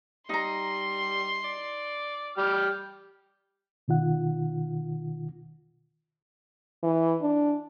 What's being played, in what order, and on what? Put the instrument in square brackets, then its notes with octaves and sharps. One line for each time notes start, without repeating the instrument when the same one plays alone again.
[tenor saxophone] G3 [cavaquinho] D#4 A#5 [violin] C6
[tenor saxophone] D5
[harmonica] G3 G4 F6
[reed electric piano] B2 D#3 F4 F#5
[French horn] E3
D4